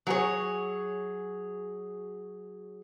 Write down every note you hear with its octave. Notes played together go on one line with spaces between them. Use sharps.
F#3 G#4 C#5